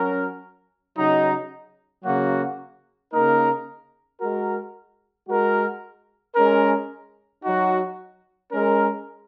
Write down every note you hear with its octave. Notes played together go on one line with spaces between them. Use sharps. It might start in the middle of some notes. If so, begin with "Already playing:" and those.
Already playing: F#3 C#4 F#4 A#4
C#3 F#3 D#4
C#3 F#3 A#3 F#4
C#3 A#3 D#4 A#4
G#3 F#4 A#4
G#3 F#4 A#4
G#3 C#4 A#4
F#3 D#4 F#4
G#3 C#4 A#4